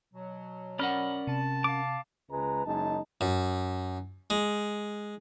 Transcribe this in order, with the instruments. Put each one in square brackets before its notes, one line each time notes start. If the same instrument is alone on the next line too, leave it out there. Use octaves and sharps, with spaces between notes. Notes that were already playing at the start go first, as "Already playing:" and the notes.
[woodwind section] B2 F#3
[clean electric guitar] C#4 A#4 F#5 [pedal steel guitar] D5 B5 F6
[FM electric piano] C3 [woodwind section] A5
[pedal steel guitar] F5 D6
[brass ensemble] C#2 G#3 B4 A#5
F#1 F#2 G#3 D#4 A5
[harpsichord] F#2
G#3